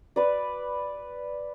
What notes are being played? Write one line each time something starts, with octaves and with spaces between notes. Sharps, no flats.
B4 D5